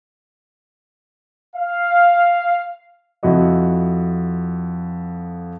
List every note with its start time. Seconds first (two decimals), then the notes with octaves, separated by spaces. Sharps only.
1.56 F5
3.23 F2 E4 F#4 D#5